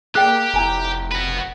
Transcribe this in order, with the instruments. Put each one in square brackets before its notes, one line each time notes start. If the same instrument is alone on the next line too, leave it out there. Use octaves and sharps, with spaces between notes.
[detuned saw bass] A#3 [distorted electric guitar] G4 [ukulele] G#4 D5 [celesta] G5 F#6
[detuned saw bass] F1 [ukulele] E4 G#5 A#5
[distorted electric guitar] F#4 B4